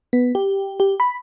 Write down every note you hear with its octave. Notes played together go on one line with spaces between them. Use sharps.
B3
G4
G4
B5